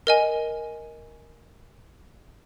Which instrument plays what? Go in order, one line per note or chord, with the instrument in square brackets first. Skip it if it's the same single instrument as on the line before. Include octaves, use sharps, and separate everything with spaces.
[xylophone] A#4 D#5 G#5